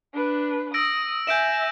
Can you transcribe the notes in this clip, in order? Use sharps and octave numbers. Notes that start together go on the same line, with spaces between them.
D4 B4
D#6 E6 A#6 D7
E5 G#5 G6 D7 E7